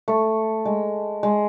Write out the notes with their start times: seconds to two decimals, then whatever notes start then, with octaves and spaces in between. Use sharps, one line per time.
0.08 A3
0.65 G#3
1.23 G#3